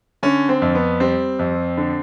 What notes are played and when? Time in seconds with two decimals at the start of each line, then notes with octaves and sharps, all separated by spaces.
0.23 D3 C#4
0.49 C4
0.62 F2
0.75 B3
1.00 G3 C4
1.39 F2
1.77 D3